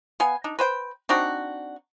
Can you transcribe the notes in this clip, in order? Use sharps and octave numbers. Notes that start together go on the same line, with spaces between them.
B3 F5 G#5
D4 D#4
B4 C5 G5
C4 D4 D#4 F#4